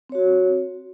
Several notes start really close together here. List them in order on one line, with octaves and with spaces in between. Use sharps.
C4 C#5 F#4